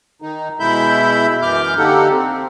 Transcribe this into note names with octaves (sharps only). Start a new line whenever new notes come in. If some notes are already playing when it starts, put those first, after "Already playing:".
D#3 D#4
B2 G#3 E4 E5 B5 G6
F#2 E3 D6 F6 G6
D3 A#3 D#4 G4 A4 F#5
C4